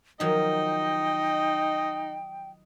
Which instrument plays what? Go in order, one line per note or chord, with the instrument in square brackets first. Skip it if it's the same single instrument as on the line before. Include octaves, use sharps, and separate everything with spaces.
[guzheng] D#3 F3 F#3 [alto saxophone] D#4 [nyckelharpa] D#5 [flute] G5